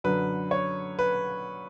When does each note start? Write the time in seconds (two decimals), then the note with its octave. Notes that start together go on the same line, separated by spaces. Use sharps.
0.04 F#2 D3 B4
0.51 C#5
0.99 B4